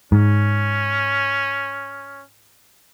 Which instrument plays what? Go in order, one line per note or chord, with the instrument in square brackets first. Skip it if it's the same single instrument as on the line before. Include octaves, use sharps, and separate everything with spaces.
[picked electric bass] G#2 [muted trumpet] C#4